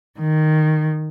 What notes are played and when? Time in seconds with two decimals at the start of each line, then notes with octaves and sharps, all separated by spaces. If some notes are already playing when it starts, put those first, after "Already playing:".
0.18 D#3